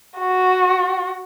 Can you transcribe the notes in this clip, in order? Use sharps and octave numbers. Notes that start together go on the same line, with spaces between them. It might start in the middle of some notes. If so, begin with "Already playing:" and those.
F#4